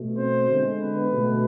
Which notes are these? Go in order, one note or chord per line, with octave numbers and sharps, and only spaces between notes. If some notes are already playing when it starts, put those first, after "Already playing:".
Already playing: B2 A3
C4 C5
D3 G#3
B3 B4
B2 A3